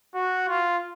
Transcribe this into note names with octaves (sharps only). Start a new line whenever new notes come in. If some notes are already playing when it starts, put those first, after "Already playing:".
F#4
F4